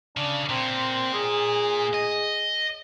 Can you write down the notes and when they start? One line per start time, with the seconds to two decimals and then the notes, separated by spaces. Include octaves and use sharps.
0.17 C#3 D4
0.49 A#2 C4
1.14 G#4
1.93 D#5